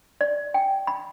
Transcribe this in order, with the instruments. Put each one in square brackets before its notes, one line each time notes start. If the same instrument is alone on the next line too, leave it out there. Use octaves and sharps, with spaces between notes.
[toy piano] D5
G5
B5